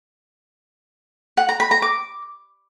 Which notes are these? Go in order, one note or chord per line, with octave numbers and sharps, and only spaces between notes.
F#5
A#5
B5
A#5
D6